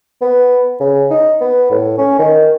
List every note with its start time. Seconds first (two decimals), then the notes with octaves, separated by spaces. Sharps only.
0.21 B3
0.80 C#3
1.10 D#4
1.41 B3
1.70 A2
1.97 C#4
2.19 D#3